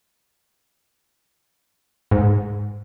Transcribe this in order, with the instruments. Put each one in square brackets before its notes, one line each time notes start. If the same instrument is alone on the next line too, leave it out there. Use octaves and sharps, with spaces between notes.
[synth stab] G#2